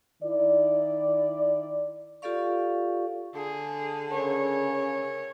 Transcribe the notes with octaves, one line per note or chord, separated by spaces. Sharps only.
D#3 E4 D5
F4 G4 A4 D5 F5 C#6
D3 G#4
C#3 A#4 C#5